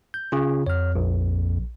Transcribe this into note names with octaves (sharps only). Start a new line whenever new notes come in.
G6
C#3 F4
F2 C#5 F6
A#1